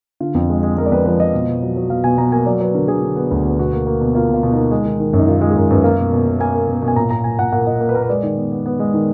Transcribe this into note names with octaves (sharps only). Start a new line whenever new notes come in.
D3 F4
F2
G#3
G#3
G#3 A#4
D5
F2 B4
F3 B4
F3 D#5
B2
B2
F#3
F#3
B2 F5
B2 G#5
B2 A#5
A#3 G#5
F#3 D5
F#3 B4
D3 A#4
D3 G#4
D3
B3
D2
B3
B2 F#4
A#3
A#3
B2
A#3 F4
B2 F4
B2
A#3 D#4
G#3
D#3
D#3
F#2
D#4
D#3 F4
G#3 F4
G#4
F#2 A#4
F#2 B4
A#3 F5
B2
B2
B2
A#3 G#5
A#3
B2
B2
G#5
A#2 A#5
A#2 A#5
A#2 G#5
A#2 F#5
A#2 F#5
A#2 D#5
A#3
B4
A#3 A#4
B4
G#3 D5
D#3
B3
B3
B3
G#3
D#3